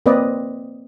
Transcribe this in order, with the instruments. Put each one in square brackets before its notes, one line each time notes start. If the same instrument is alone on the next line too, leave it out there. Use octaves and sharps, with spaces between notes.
[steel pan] A#3 C4 B4 D5 D#5